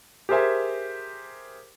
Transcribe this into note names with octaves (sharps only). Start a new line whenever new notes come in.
G4 G#4 A#4 C5 E5 G#5